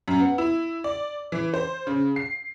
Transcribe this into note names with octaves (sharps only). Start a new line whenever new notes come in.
F#2
B3
E4
D5
E3
C5
C#3
C7